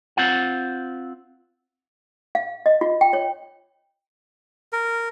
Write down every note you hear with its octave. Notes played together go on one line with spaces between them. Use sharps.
C4 F4 F#5
F5
D#5
F4
G5
C#5
A#4